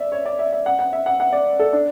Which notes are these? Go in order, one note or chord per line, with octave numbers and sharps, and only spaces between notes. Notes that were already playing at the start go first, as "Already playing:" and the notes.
Already playing: D5 E5
C#5
D5
E5
E5
F#5
F#5
E5
F#5
F#5
D5
A4
D4